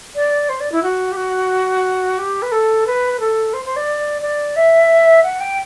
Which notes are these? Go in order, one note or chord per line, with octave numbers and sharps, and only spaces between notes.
D5
C5
D5
E4
F#4
G4
F#4
G4
B4
A4
B4
A4
C5
C5
D5
D5
E5
F#5
G5